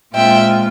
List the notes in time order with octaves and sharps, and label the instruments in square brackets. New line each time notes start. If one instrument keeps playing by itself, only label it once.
[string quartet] A#2 G#3 C4 F4 E5 G5